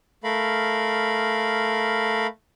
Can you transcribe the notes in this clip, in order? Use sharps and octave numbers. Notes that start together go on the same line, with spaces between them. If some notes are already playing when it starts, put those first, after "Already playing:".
A3 A#4 F5 B5